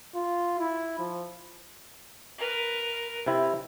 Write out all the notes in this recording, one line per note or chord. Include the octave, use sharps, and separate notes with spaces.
F4
E4
F3
A#4 B4
C3 C4 E4